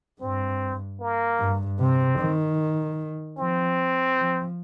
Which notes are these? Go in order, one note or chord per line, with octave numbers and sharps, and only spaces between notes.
G2 C4
A#3
G2
C3 C4
D#3
F3 C4
F3